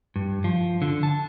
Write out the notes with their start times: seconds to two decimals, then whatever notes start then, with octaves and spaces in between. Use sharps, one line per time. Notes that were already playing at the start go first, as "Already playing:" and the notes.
0.16 G2
0.44 F3
0.82 D3
1.03 A5